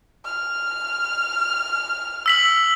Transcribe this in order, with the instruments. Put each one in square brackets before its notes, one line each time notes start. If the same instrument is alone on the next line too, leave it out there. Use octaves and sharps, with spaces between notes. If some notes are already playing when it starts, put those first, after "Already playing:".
[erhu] F6
[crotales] E6 B6 F#7